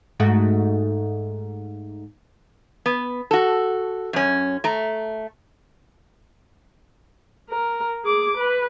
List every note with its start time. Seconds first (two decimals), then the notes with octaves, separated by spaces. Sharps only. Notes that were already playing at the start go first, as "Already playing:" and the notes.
0.20 G#2 A3 F#4
2.86 B3
3.31 F#4 A4
4.13 F#2 C#4
4.64 A3 A#5
7.49 A#4
8.04 G#4 D6
8.37 B4